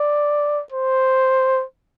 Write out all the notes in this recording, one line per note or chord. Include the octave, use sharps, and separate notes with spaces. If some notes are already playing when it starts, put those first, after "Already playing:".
Already playing: D5
C5